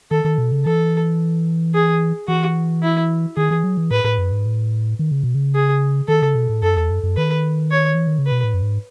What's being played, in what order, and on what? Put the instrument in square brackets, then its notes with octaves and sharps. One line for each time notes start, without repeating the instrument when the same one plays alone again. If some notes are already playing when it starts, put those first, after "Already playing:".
[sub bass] D#3 [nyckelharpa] A4
[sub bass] D#3
B2
C#3
[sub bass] E3 [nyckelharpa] A4
[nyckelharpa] G#4
[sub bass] E3 [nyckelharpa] F#4
[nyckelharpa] E4
[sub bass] D#3 [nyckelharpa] G#4
[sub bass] E3
F#3
E3
[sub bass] A2 [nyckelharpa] B4
[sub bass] A2
F#2
G#2
A2
D#3
C#3
B2
C#3
[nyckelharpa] G#4
[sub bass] D#3 [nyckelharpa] A4
[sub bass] C#3
B2
A2
[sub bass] F#2 [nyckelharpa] A4
[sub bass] E2
F#2
F#2
[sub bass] D#3 [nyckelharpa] B4
[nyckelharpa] C#5
[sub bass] E3
D#3
C#3
[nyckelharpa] B4
[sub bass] B2
A2
F#2
G#2